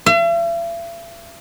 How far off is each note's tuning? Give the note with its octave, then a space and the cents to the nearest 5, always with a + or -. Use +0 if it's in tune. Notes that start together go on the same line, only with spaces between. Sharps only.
E5 +45